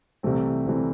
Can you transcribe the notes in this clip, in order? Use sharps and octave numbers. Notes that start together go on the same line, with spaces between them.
C2 C3 E3 A3 C4
C2 C3 E3 A3 C4